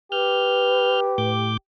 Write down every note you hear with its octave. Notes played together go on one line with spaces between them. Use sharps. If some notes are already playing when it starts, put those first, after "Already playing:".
G4 B4 F6 G6
A2 D6 G6